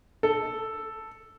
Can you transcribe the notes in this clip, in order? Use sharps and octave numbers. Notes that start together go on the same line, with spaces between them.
A4